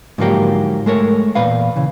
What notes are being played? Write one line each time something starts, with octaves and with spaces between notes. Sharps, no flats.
G#2 D3 F3 F#3 A#3 G4
G#3 A3 A#4 C#5
E2 A#2 B4 F5
C#3 E3